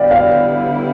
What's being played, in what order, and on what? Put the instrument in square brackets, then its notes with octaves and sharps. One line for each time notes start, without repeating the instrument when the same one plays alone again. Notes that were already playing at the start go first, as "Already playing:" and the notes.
Already playing: [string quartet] D3 G3 B3 E4 [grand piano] D5 F5 G5
[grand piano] D5 F5